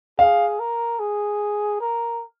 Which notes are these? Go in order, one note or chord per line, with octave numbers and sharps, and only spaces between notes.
G#4 F5
A#4
G#4
A#4